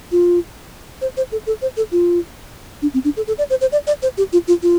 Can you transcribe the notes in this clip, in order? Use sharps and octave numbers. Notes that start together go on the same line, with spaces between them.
F4
C5
C5
A4
A4
C5
A4
F4
D4
C4
D4
A4
A4
D5
C5
C5
D5
D5
C5
G4
F4
F4
F4